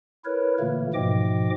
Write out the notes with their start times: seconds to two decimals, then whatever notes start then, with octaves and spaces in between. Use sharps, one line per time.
0.25 E4 A#4 B4 C#5
0.60 A#2 D3 E3 A3 A#3
0.94 G#2 B2 F3 D#5 G5 D6